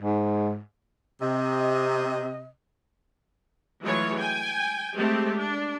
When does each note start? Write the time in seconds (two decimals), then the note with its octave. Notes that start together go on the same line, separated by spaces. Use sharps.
0.01 G#2
1.22 C3 D#5
3.82 E3 F#3 G#3 A3 F4 C#5
4.18 G5 G#5
4.95 G#3 A3 C4 G4
5.37 D4